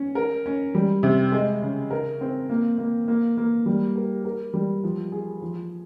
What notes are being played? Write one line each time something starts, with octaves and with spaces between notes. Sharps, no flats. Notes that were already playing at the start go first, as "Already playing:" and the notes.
Already playing: C#4
A#4
C#4
G3
C3
G#3
C#3
A#4
C4
A#3
A#3
A#3
A#3
G3
A#4
A#4
G3
F3
G#4
F3